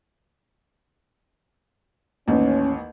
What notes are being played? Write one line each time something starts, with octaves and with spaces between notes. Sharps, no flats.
A1 D#2 C#4